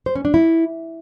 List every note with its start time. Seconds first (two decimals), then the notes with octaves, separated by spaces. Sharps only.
0.06 C5
0.15 C#4
0.25 D4
0.34 E4